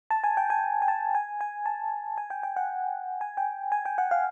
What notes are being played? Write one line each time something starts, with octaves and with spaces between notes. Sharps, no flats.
A5
G#5
G5
G#5
G#5
A5
G#5
G#5
A5
G#5
G5
G5
F#5
G#5
G5
G#5
G5
F#5
F5